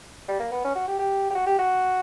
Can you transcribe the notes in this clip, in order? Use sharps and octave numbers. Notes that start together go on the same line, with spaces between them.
G3
A#3
B3
C#4
F#4
G4
G4
G4
F#4
G4
F#4